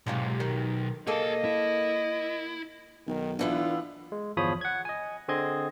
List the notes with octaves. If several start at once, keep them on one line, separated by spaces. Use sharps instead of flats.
B1 G#2 C3 F4
D#3
A#3 G#4 A4 D#5 A5
E4
B1 D#3
D3 E3 B3 D4 F4
G#3
G1 E2 F3 C#5 B5 D#6
F#5 G#6
D#5 G#5
D3 C4 G#4 D#5 G#6